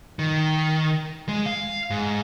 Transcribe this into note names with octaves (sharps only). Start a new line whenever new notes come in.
D#3
G#3
F5
G#2